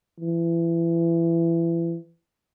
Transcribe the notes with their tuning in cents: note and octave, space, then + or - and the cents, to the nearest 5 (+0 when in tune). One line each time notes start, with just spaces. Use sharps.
E3 +25